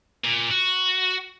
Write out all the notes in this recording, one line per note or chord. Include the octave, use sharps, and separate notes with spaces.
A#2
F#4